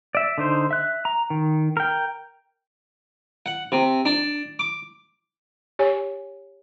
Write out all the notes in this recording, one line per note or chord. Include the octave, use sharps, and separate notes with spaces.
D5 E5
D3 D#4 C5
E5 F#6
A#5
D#3
A#4 G5
F#5
C3
D4
D6
G4 C#5 G#5